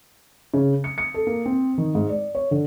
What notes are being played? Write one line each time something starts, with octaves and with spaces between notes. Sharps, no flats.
C#3
C#7
C#7
A4
A#3
C4
D#3
G#2
D5
C#5
D3